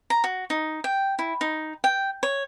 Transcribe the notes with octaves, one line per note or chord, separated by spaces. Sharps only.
A#5
F#4
D#4
G5
E4
D#4
G5
C#5